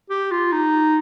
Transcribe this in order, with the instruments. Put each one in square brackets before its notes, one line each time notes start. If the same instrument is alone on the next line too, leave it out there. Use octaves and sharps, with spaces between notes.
[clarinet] G4
F4
D#4